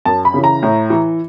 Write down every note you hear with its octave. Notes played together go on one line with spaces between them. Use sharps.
F#2 A5
B5
C#3 E3
A#5
A2
E3